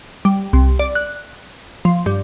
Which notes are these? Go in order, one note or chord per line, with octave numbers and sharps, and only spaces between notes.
G3
C2
D5
F#6
F3
G2